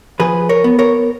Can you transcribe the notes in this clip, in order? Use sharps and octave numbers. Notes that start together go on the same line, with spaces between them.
F3 G#4 B4
A#4 C#5
B3
A#4 C#5